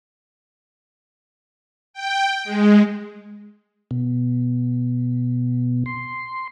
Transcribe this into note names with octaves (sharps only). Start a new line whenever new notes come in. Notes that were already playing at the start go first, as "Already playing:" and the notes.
G5
G#3
B2
C6